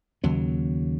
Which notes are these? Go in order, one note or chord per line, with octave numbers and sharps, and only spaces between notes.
D#2 C#3 F#3